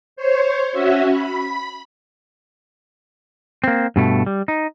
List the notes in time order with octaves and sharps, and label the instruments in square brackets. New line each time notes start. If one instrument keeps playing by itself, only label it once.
[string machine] C5 C#5
C#4 F#4 E5
B5
[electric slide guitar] A#3 C4
G2 B2 A3
G3
D#4